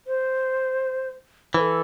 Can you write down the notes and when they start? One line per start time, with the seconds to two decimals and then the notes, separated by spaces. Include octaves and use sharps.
0.07 C5
1.54 E3 C5
1.59 A4